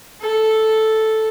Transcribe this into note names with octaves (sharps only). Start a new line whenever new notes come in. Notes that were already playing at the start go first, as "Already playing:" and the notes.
A4